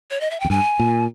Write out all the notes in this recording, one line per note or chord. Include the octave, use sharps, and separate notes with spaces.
C#5
D#5
E5
E2 G5
G2 G#5
A#2